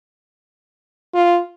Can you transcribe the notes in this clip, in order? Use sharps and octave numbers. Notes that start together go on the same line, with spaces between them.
F4